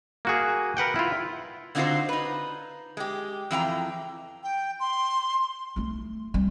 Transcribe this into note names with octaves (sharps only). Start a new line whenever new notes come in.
A#3 F#4 G#4
A#4 B4 F#5 G5
E4 F4
D3 C4 D#4 F4 F#4 C5
D#4 B4
G#3 G4
F2 E3 G5 A#5
G5
C6
A3 D#4
G3 C4